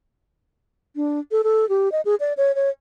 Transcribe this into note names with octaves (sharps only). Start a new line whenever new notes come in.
D4
A4
A4
G4
D#5
G#4
D5
C#5
C#5